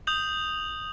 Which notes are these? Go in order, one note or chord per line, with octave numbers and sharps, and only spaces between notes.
D#6 G6 F7 F#7